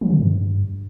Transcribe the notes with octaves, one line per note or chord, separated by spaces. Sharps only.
F3
D3
G2